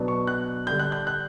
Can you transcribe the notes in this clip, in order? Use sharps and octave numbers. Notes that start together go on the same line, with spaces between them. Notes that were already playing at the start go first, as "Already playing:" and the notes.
Already playing: B2 F#3 B3 D4
C#6
F#6
D3 G3 D4 G6
F#6
G6
F#6